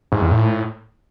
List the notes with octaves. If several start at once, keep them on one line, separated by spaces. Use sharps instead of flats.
G#2
E2
A2